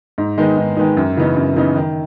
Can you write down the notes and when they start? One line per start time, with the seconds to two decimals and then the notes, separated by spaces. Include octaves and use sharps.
0.18 G#2
0.38 D#3 G#3 B3 D#4
0.57 G#2
0.77 D#3 G#3 B3 D#4
0.97 F#2
1.17 C#3 E3 B3 D#4
1.37 F#2
1.56 C#3 E3 B3 D#4
1.76 D#3